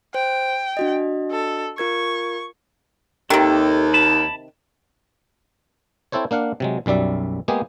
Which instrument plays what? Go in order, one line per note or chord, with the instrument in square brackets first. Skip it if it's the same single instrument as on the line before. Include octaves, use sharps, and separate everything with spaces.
[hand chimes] C5 [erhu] G5
[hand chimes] D4 F#4 D#5
[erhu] A4
[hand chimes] F4 A#4 G#6 [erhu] C#6
[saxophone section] D#2 [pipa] C3 D#3 [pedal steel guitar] A4
[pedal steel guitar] A5 B5
[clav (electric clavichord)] C4 E4 A4 C5 C#5
A#3 D4 F5 F#5
C3 F#3 G#3
B1 F#2 G3 D5 E5
G#3 A#3 B3 G4 G#4